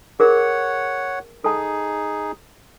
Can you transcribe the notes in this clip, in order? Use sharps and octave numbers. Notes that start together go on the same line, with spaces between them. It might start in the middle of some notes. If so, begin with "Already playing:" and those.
G#4 A#4 C#5 F#5
D#4 G#4 A4 A5